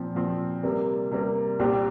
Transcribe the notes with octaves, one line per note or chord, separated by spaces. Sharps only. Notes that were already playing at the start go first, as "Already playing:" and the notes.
Already playing: A#2 F3 C4
A#2 F3 C4
C3 G3 A#3
C3 G3 A#3
C2 A#2 G3 C4 G4